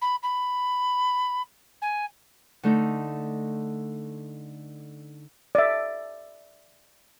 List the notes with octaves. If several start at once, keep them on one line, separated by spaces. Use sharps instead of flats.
B5
B5
G#5
D3 A3 D#4
D5 E5